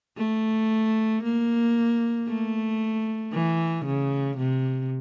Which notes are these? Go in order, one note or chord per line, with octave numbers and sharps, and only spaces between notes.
A3
A#3
A3
E3
C#3
C3